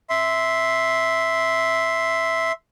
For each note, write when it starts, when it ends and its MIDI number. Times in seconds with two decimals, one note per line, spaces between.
0.10 2.52 76
0.10 2.52 84